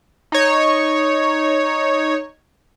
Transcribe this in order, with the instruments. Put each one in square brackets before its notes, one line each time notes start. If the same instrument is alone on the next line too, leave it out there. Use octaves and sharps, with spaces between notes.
[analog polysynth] D#4 C#5